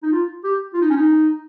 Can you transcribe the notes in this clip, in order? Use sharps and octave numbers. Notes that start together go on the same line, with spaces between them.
D#4
F4
G4
F4
D#4
C#4
D#4